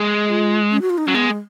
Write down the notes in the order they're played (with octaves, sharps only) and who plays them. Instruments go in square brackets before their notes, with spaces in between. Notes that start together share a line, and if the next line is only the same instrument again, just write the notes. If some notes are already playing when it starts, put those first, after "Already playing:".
Already playing: [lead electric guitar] G#3
[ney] F4
C#4
F#4
F4
D#4
[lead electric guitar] F#3 [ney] C#4
[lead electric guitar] G#3 [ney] B3
[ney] G#3